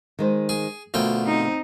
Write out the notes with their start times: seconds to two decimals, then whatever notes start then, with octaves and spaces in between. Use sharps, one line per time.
0.19 D#3 G#3 C5
0.49 G#4
0.94 D2 B2 F3 F#4 A#4 G5
1.25 C4 D#4